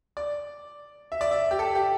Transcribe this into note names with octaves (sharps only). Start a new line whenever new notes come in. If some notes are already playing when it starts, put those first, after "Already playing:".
D5
E5
D5
E5
G4
A4
G4